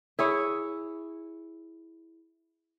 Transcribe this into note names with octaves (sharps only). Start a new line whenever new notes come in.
E4 G#4 C#5